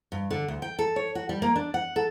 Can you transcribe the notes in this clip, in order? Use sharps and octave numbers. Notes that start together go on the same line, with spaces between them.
G2
D3
D2
G5
A4
C#5
F#4
G3
A#3
D4
F#5
A4